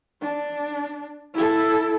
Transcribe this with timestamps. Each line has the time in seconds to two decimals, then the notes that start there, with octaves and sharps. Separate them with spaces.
0.21 D4
1.34 E4 A4